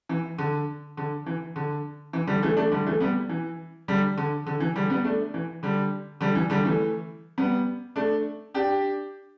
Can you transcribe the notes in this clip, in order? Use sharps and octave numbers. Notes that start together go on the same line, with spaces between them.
E3
D3
D3
E3
D3
E3
D3 G3
E3 A3
A3 D4
D3 G3
E3 A3
G3 B3
E3
D3 G3
D3
D3
E3
D3 G3
G3 B3
A3 D4
E3
D3 G3
D3 G3
E3
D3 G3
E3 A3
G3 B3
A3 D4
D4 G4